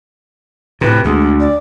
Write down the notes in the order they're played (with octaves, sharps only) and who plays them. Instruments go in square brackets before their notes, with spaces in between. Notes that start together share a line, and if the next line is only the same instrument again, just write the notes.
[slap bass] A2 C3 [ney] B4
[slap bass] D2 [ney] G#3
[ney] D5